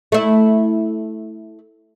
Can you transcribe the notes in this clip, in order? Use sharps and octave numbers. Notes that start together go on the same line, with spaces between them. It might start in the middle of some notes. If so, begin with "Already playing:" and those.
A3 E4